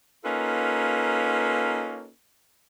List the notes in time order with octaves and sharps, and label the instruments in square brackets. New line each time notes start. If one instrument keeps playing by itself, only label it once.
[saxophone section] A#3 C#4 D#4 F4 A4 B4